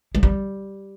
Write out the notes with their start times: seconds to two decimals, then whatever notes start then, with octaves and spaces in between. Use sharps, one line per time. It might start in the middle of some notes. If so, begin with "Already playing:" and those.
0.15 G#3
0.23 G3